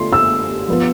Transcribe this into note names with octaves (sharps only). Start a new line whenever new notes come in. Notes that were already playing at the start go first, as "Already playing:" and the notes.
Already playing: D3 A3 D4 F4 C6
E6
F3 B3 F4